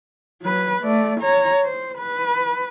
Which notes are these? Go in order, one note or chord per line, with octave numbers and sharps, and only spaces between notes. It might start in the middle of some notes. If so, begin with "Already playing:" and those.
F#3 B4
A3 D5
C#5 A#5
C5
B4